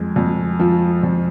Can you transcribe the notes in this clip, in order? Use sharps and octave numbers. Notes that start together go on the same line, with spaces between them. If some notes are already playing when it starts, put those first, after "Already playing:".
Already playing: F2 G#3
F2
F3
F2